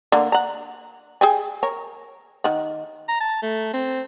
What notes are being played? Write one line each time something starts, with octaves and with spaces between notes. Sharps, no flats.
D3 A#3
F#5 A#5
G#4 G5 G#5
A#4 C#5
D#3 F#5
A#5
A5
A3
C4